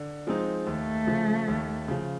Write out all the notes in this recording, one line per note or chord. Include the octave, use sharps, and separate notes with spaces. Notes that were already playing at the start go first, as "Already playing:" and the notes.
Already playing: D3
F3 G#3 C4 D#4
D#2 A3
C#3 F3
D#2
C#3 F3